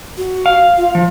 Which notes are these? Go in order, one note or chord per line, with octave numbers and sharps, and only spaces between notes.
F#4
F5
F4
F3